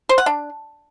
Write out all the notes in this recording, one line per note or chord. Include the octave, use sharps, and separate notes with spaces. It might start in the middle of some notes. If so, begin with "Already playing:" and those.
C5
F#5
D4